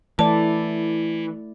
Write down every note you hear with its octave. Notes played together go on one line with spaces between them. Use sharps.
E3 A3 E4 D5 A5